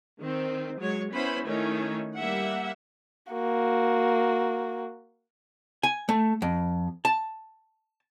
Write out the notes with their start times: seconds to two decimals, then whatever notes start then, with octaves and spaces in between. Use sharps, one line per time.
0.20 D#3 C4
0.79 F#3 G#3 C#5
1.12 B3 C#4 E4 C5 B5
1.45 D#3 A3 C#4 D#4 E4 C#5
2.17 G3 A#3 E5 F#5
3.33 A#3 F#4
5.83 G#5
6.09 A3
6.42 F2
7.05 A5